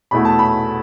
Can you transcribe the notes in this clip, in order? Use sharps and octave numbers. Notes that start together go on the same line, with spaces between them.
E2 B2 A3 E4 B5
A5
B5